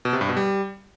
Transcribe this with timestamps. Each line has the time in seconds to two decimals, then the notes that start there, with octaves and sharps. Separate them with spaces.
0.05 B2
0.13 C3
0.21 G2
0.29 B2
0.37 G3